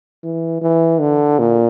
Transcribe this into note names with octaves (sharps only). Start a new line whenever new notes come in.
E3
E3
D3
A#2